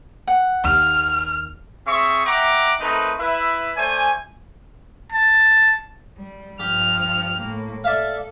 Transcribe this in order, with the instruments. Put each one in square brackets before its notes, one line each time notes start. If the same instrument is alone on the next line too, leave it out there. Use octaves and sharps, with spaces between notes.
[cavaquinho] F#5
[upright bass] D#2 [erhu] F6
[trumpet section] C4 G#4 E5 C#6
E5 F#5 G5 A#5 D6
A3 A#3 C4 D#4 B4
E4 B4 E5
A3 C5 D5 G#5
[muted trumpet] A5
[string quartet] G3
[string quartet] G2 F3 F6 [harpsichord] G4
[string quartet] A2 A#3
[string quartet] A4 [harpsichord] D5 E5 F5